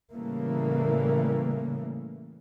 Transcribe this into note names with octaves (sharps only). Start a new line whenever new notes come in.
A2 C#3 E3 G3 A3 A#3